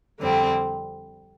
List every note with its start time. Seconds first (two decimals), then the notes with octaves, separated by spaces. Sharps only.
0.20 F2 D3 G3 C4